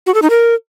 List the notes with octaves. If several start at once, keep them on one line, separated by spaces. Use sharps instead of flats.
F#4
A4
D#4
A#4